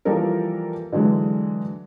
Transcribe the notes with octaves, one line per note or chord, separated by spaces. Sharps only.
E3 F3 G3 A#3 A4 A#4
D3 E3 F#3 G#3